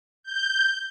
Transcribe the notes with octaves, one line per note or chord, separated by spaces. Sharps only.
G6